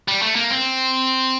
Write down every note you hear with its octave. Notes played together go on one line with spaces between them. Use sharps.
G3
A3
A#3
C4